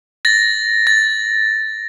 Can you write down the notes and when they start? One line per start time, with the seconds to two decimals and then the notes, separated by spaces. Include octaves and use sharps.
0.25 A6 A#6
0.87 A6